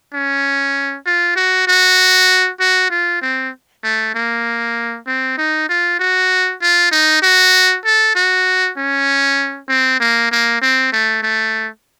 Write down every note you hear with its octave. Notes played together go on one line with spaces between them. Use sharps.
C#4
F4
F#4
F#4
F#4
F4
C4
A3
A#3
C4
D#4
F4
F#4
F4
D#4
F#4
A4
F#4
C#4
C4
A#3
A#3
C4
A3
A3